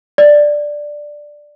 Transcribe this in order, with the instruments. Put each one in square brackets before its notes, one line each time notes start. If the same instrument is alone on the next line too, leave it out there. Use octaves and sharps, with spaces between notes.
[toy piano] D5